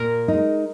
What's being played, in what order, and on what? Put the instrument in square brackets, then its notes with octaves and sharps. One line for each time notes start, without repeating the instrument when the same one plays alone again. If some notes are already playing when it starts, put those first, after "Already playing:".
Already playing: [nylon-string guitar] A#2 [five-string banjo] A#4
[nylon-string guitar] G#3 D#4